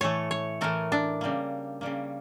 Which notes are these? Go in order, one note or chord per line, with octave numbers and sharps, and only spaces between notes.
A2 E3 A3 C#5
C#5
A2 E3 A3 A#4
D4
C#3 G3 A#3
C#3 G3 A#3